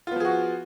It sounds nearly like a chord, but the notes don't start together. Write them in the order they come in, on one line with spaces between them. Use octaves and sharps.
F4 B3 F3 G#4 F#4